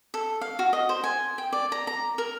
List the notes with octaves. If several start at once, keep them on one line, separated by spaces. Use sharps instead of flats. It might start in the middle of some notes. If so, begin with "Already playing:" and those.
A4
F5
F#4
D#5
C5
G#5
G5
D5
A#5
A#5
A#4